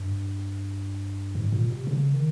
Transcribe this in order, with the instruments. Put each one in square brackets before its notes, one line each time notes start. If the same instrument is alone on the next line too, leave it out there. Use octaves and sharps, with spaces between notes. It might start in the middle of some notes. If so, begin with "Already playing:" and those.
Already playing: [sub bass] G2
G#2
A#2
C3
C#3
D#3